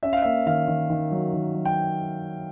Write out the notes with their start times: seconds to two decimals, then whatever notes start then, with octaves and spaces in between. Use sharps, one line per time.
0.03 C#4 E5
0.13 F5
0.22 A#3 E5
0.46 D#3 F5
0.67 D#3
0.90 D#3
1.11 F#3
1.33 D#3
1.55 F#3
1.65 G5